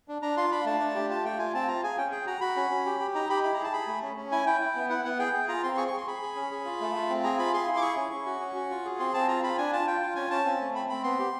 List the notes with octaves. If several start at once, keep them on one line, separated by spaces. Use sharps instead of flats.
D4
D4 A#5
F4 C6
D4 B5
A3 A5
D4
G4
F4 A5
A3 G5
F4 G#5
C4 A5
F4 A#5
G#4 G#5
C#4 G5
G#4 G5
F#4 A#5
F#4 B5
C#4
C#4
G4
G4
D#4 A#5
G4 B5
E4 B5
A#5
G#4
A5
G#4 B5
A3
C#4
C#4
E4 G#5
E4 G5
E4
B3
E4 F#5
B3 F#5
G#4 G5
G#4
F4 A#5
C4 C6
G#4 C#6
C#6
G#4 C6
G#4 B5
G#4
C#4
G#4
F4
A3
F4
C4
G#4 A#5
F4 B5
G#4 C6
E4
D6
G#4 C#6
C#4
C#4
F#4
C#4
F#4
F4
G#4
C4 C6
C4 A5
F4 A#5
F4 B5
D4 G#5
F4 A5
F4 G5
F4
C#4 G#5
C#4 A5
C4
A3
C4 B5
C4 B5
B3 C6
G4